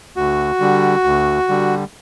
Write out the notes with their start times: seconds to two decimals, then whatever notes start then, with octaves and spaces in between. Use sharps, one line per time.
0.16 D2 F#4
0.60 D3 G3
1.04 D2
1.49 D3 G3